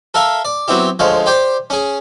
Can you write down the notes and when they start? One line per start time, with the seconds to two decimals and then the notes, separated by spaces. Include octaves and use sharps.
0.14 A4 A#4 E5 F5
0.45 D5
0.68 F#3 B3 C4 E4 G4
0.99 D2 F3 G#3 C#5 F5
1.26 G4 C5 D5 G5
1.70 C#4 G#4